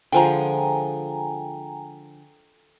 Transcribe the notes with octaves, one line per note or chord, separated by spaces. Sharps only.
D3 F3 G#3 G5 G#5 A#5